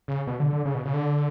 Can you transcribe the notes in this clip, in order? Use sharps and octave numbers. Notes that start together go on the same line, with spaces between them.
C#3
B2
D3
D3
C#3
B2
C#3
D3